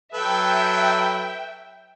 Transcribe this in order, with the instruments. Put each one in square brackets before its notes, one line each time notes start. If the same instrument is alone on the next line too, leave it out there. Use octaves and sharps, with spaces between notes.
[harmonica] F#3 A4 B4 [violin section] E5 G5